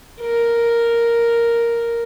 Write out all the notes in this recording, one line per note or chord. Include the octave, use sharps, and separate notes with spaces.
A#4